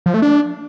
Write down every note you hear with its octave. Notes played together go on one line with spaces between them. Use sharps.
F3
A3
D4